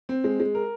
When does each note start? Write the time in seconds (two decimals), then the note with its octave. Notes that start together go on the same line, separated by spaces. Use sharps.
0.09 C4
0.24 G#3
0.40 G#3
0.55 A#4